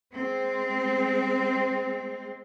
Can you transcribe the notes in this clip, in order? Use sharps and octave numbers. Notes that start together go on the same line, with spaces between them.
G#3 C4